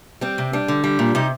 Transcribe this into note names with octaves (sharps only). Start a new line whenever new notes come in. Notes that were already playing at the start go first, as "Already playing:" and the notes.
G3 C4
C3
G3 D4
D3
G3
A#2
C3 D#4